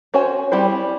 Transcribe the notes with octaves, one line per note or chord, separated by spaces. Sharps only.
C#4 F#4 C5 C#5 G#5
G3 C4 E4 C5